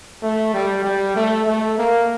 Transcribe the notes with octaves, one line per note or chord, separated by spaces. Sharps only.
A3
G3
G3
A3
A3
A#3